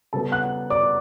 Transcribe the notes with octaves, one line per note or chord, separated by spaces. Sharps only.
C#3 G3 B3 A4 A5
F#5 F#6
D5 D6